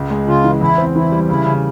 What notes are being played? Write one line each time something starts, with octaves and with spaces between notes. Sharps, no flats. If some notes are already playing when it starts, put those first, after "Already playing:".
Already playing: C#2
G#3
C#3 F4
E3
E2 E4
C4
E3 E4
G3
C#3 E4
C#3